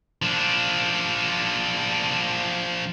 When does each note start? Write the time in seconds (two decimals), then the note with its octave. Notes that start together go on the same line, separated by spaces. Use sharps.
0.22 F3 D4